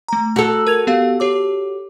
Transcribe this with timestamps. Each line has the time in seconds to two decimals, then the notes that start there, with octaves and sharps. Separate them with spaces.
0.08 A3 A#5
0.36 F#4 A4
0.67 A#4 G#6 F7
0.87 B3 G4 F5
1.20 G4 C#5 D6